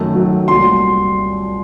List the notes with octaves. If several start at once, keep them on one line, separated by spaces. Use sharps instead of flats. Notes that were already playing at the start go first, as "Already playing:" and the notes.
Already playing: F#2 D#3 F#3 A3
F#2 D#3 F#3 A3
C2 A#2 F#3 C6